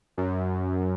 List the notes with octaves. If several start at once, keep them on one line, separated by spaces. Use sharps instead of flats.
F#2